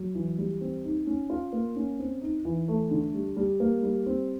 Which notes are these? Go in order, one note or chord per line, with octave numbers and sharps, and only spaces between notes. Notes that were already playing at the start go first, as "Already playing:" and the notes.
Already playing: F#3
E3
G3
C4
D#4
C#4
F4
A#3
C#4
C4
D#4
E3
A3
D3
G3
G3
A#3
G3
C4